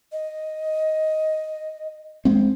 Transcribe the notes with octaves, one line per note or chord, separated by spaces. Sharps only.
D#5
G#3 C4